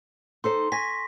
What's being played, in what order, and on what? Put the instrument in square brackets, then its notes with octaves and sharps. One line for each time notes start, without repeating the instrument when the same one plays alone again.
[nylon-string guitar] D#4 A4 C5 [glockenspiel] C6
[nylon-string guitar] G#5 [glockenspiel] C#6 A#6 B6